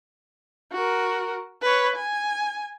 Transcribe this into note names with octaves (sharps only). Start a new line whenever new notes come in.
F#4 A#4
B4 C#5
G#5